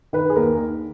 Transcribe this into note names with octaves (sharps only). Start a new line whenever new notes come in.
D#3 B4
G#4
D#2 A#4
D#3